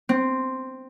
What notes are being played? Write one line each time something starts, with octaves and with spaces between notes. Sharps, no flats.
C4